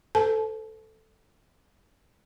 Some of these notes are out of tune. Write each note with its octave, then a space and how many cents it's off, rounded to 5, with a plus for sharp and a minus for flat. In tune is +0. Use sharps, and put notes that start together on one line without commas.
A4 +0 C5 -45 A5 -35